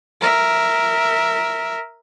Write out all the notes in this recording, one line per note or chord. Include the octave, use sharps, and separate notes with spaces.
A#4 E5